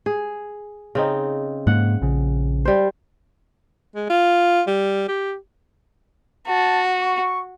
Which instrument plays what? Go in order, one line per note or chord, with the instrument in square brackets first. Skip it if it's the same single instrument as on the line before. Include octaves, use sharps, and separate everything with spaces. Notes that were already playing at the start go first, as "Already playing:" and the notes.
[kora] G#4
C#3 C4 D#4
[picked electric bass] G#2 G#3 A#3 [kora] F#5
[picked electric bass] A#1 C#3
[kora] G3 C5
[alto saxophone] G#3
F4
G3
G4
[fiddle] F#4 [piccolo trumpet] A5
[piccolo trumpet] C#6